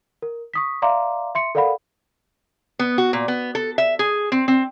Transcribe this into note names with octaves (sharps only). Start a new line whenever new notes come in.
A#4
C#6 D#6 B6
D5 E5 F5 A#5 C6 D6
E5 C6 C#7
A4 A#4 D5 F5 F#5 B5
B3
F#4
A#2
B3
A4
E5
G#4
C4
C4